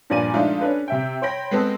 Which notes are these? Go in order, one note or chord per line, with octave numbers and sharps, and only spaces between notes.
G2 A#2 F3 D5 G#5 D#7
F3 G#3 A3 D4 D#4 F4
C#4 D4 A4 B4
C3 E5 G5
C5 C#5 G5 B5 A#6
G#3 B3 C4 A4